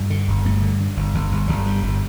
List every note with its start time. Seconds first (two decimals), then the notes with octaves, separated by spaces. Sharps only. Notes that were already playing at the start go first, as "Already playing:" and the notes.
Already playing: G2
0.10 D3
0.28 G1
0.45 G2 A3
0.62 D3
0.80 D3
0.97 G1
1.14 G1
1.32 G1
1.48 G1 G3
1.66 G2
1.83 G1